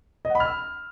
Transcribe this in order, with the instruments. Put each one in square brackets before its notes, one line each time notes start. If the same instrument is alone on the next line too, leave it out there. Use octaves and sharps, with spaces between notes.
[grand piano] D#5
F#5
B5
F6
E6